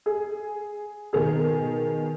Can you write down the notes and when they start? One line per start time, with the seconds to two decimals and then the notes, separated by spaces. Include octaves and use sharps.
0.06 G#4
1.13 B2 D#3 G#4